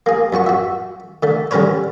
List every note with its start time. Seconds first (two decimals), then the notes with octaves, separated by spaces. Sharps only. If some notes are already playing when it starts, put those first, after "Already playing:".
0.06 A#3 G#4
0.33 F#2 B3 F#4 C#6
0.46 F#4 E5
1.23 D3 A3
1.51 D3 G3 C#4 A#4 B4 C#5